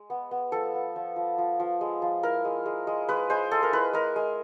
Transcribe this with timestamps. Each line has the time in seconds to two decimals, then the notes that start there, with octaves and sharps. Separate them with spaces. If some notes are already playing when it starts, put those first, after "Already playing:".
Already playing: G#3
0.10 B3
0.31 B3
0.52 F3 A4
0.74 B3
0.96 F3
1.16 F3
1.38 F3
1.60 F3
1.81 G#3
2.02 F3
2.23 E4 A#4
2.45 G#3
2.66 G#3
2.87 G#3
3.08 G#3 B4
3.30 G#3 C5
3.51 G#3 A4
3.63 A#4
3.72 E4 B4
3.93 G#3 A#4
4.16 G#3